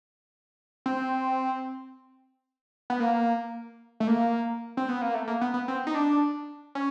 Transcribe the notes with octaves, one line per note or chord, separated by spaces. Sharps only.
C4
B3
A#3
A3
A#3
C4
B3
A#3
A3
A#3
B3
B3
C4
D#4
D4
C#4